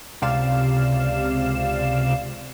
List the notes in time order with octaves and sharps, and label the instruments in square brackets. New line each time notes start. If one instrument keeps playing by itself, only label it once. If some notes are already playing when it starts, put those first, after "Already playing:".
[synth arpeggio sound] C#2 C3 D5 F5 E7